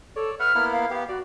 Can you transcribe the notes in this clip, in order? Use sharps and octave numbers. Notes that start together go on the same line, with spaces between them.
A4 C#5 D5
B4 E5 F#5 F6
A#3 B3 E4
F5
B3 G4
F#4 D5